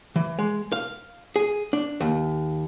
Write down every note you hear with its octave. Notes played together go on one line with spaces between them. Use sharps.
E3
G#3
F5
G#4
D4
D#2